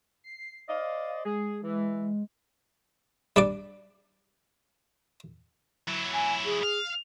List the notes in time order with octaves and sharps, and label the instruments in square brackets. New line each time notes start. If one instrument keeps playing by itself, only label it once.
[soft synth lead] C7
[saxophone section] C5 D5 D#5 [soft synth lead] F5
[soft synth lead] G#3 [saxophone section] G#4
[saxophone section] E3
[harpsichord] G3 D4 D5
[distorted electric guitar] F#3 E4
[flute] G#5
G#4
[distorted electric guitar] F5